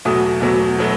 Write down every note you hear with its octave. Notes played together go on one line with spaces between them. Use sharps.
E2 B2 F#3 A3 D#6
E2 B2 F#3 A3
B2 F#3 A3